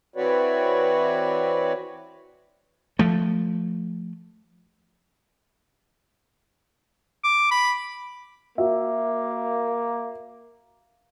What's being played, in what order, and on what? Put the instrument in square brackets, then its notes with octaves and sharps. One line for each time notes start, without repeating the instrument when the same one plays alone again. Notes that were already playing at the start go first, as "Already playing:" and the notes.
[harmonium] E3 C4 F#4 B4 C#5 D5
[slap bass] F3 A3
[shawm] D6
B5
[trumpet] A#3 [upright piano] F#4 E5